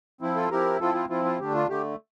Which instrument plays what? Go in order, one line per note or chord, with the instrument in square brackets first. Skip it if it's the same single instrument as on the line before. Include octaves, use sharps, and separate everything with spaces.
[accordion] F3 C4 E4
F4 A4
F3 C4 E4 G4 A#4
F3 C4 E4 F4 A4
F4
F3 C4 E4 F4
F4
D3 A3 D4 G4
F4
D3 A3 G4